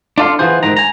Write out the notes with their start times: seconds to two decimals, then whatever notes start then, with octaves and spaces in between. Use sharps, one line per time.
0.18 D4 F4 A4 F5 C6
0.39 E3 F3 B3 F4 G#4 C5
0.63 D2 G#2 D#3 A#5
0.77 G#5 A#5